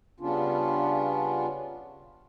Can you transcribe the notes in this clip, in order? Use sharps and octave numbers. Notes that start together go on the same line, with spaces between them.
C#3 G3 B3 C#4 D4 F4